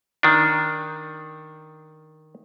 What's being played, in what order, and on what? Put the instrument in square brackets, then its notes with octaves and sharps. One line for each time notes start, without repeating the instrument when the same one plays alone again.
[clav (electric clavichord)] D#3 D4